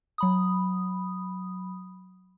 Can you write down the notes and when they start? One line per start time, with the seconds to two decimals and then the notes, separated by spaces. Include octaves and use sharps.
0.18 F#3 B5 D#6